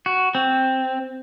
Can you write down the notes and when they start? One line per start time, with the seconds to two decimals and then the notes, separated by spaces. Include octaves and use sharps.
0.06 F#4
0.35 C4